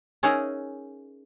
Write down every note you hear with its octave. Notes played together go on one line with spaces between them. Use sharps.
C#4 D#4 G#4 A#4 E5 F#5